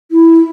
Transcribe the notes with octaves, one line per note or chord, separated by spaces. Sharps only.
E4